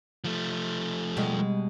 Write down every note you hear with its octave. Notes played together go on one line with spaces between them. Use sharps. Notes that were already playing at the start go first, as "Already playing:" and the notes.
F3 A3
B2 G3 G#3